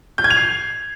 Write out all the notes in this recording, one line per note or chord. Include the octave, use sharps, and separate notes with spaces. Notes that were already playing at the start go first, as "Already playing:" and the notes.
G6
G#6
F7
C7